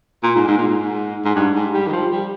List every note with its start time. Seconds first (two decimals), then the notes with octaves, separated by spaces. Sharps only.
0.23 A#2
0.35 G#2
0.48 G#2
0.58 A#2
0.67 G#2
1.25 G#2
1.36 G2
1.55 G#2
1.74 G3
1.87 D#3
1.93 F3
2.11 G3